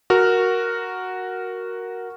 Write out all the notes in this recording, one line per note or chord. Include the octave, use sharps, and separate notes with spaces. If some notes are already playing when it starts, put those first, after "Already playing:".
F#4 A#4 F6